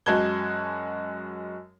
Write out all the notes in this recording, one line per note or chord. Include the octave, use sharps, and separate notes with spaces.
F#2 G#3 F#4 A5 G#6 G7